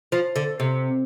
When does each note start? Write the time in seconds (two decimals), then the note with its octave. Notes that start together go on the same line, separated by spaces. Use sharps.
0.12 F3
0.36 D3
0.60 C3